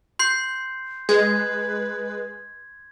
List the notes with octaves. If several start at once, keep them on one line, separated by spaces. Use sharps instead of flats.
C6 G6 C7
G#3 B4 G#6